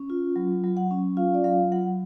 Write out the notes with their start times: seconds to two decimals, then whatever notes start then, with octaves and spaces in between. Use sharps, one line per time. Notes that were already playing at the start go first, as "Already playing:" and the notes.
Already playing: C#4
0.10 F4
0.36 F#3
0.63 F#3
0.77 F#5
0.91 C#4
1.17 F4 F5
1.34 D5
1.44 F#3 F5
1.72 F#3 F#5